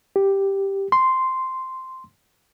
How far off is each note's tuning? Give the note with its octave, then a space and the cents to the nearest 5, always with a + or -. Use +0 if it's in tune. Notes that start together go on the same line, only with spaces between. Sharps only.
G4 +0
C6 -5